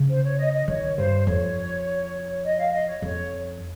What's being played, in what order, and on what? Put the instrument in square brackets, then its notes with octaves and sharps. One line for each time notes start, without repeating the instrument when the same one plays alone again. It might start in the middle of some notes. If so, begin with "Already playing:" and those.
Already playing: [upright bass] C#3
[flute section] C5
C#5
D#5
D#5
[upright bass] D#3 [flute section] C#5
[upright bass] G2 [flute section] C5
[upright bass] F2 [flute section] C#5
[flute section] D#5
F5
D#5
C#5
[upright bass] F2 [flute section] C#5